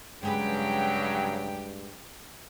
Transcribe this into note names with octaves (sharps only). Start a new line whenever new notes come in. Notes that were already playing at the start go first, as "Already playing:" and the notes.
G2 C#3 F#3 G#3 G4 G#4 B4 G5